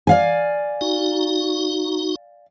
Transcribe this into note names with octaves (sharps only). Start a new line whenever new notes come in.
D5 F5 G#5
D#4 F#4